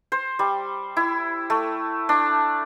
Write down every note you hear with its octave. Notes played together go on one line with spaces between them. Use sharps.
C5
G3
E4
A3
D4